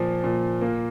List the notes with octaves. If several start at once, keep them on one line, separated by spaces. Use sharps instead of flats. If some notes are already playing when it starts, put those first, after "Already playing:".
Already playing: A#2 F3
A#2
A#3